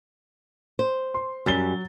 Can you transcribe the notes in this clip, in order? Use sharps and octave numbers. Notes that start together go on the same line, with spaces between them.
C5
C6
F#2 F#3 G3 A6 G7